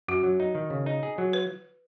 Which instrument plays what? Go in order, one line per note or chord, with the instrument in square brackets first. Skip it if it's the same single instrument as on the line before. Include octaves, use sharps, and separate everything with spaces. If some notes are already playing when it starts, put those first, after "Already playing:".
[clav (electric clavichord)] F#2 [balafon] F#4
[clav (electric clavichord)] F#3
D#4
D#3
C#3
D#4
G#4
F#3
[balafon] B4